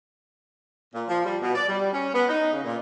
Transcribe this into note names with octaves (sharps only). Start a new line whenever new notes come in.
A#2
F3
G3
B2
D5
G3
C#4
B3
D#4
C#3
A#2